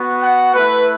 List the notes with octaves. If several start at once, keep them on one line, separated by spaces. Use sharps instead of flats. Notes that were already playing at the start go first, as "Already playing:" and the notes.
Already playing: B3 F#4
F#5
A3 E4 B4